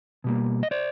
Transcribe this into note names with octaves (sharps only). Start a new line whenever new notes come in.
B2 G3 A#3
D#5
C5 D5